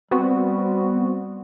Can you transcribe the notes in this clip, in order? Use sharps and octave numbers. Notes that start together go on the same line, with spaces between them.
G3 B3 C4 F#4